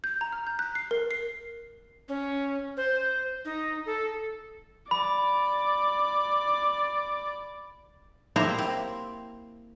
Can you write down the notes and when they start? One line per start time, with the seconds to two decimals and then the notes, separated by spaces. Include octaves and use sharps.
0.04 G6
0.21 A#5
0.32 F6
0.47 G6
0.59 F#6
0.75 C7
0.91 A#4
1.11 C7
2.08 C#4
2.77 C5
3.45 D#4
3.86 A4
4.91 D5 B5
8.36 A#3 E4 G4 C5 E5 A#5
8.58 C4